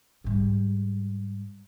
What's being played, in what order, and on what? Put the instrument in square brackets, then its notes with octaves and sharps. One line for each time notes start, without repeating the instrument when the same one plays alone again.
[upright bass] G#2 G3